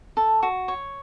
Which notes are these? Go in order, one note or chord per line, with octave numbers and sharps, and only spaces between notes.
A4
F#4
C#5